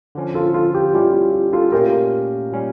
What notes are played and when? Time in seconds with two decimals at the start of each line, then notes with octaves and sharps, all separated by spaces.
0.15 D3 F3 C#4
0.34 F4 A4
0.54 F4 A4
0.74 G4
0.94 G3 C#4 E4 F4 G4
1.14 F4
1.32 F4
1.53 F4 A4
1.72 A#2 A3 C#4 F4 G4 A#4
2.52 A#2 G3 C#4